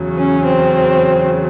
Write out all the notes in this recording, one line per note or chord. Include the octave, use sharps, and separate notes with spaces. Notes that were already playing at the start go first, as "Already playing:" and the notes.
Already playing: E2 C#3 F#3
C#4
C4